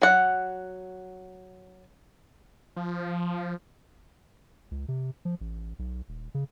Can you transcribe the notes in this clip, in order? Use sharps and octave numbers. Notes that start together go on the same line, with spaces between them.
F#3 F#5
F3
C#2
C3
F3
A1
B1
D#1
C#3